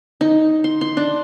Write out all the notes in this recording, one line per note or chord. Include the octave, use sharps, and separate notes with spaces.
D#4
C6
C6
D4